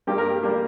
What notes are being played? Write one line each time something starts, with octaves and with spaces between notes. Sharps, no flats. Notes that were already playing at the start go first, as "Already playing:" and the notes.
G2 G3 A#3 G4
A#4
G4
G3 A#3